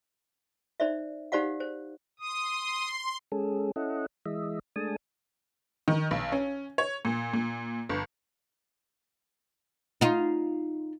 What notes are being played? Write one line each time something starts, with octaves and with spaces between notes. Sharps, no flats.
D#4 C5 D5 E5
D#4 G4 C5 D5 F5 F#5
C5
C6 D#6
G#3 C#4 G#4 A4
C#4 E4 A4 D#5 F#5
E3 G#3 D#5 E5
G#3 A3 D4 G#5 A5 D#6
D#3
B1
C#4
C#5
A#2
A#2
G1
D#4 F4